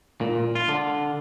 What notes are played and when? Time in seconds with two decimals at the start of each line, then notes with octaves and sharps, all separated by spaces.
0.21 A#2
0.55 F4
0.69 D3